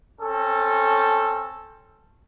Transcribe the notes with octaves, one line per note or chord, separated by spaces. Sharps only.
C4 C#4 A4